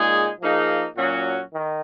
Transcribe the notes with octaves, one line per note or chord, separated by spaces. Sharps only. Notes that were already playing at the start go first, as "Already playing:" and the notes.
Already playing: A#2 G#3 D#4 G#4
F3 A#3 D#4 G#4
A#2 F#3 C#4 F#4
D#3